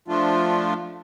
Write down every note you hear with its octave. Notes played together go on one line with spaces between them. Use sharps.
F3 A3 D4 F4